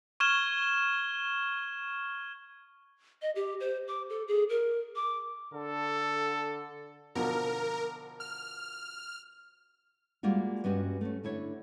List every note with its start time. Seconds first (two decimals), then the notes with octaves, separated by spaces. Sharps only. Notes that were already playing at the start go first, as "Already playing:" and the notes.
0.20 C#6 F6 G#6 E7 G7
3.22 D#5
3.36 G4
3.60 C5
3.88 D6
4.10 A4
4.28 G#4
4.50 A#4
4.96 D6
5.53 D3 A4
7.15 B2 D3 F3 A#4
8.20 F6
10.23 G3 G#3 A#3 F4 F#4
10.64 G2 B3 C#4 F#4 G4 D#5
11.01 A3 C#4
11.24 D3 E4 C#5